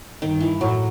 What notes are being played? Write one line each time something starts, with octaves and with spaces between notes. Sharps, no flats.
G2 D#3
E3
A2 F#3